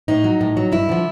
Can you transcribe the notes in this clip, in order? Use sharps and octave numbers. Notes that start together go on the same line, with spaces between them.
A2 D#4
F#3
A2
F#3
G2 E4
D3 F3